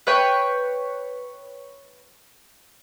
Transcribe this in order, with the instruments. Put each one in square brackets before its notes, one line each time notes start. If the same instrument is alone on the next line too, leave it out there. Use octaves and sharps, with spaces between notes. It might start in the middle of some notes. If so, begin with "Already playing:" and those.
[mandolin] B4 C#5 G5